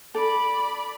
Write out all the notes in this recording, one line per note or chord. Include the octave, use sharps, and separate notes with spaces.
A4 D5 B5